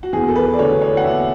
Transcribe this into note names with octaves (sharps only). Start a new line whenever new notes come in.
F#4
E2 G#4
A4
B4
D5
D3 A3 C#5
C#5
F#5
E2 E5